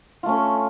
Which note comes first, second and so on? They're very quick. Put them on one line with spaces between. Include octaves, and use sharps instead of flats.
F4 A3 C#4